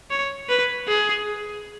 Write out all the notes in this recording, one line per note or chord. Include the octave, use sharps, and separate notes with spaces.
C#5
B4
G#4